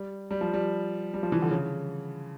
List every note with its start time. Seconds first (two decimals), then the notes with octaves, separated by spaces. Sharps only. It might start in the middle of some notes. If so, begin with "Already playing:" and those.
Already playing: G3
0.31 G3
0.41 F3
0.54 G3
1.14 G3
1.23 F3
1.32 E3
1.42 D3
1.50 C#3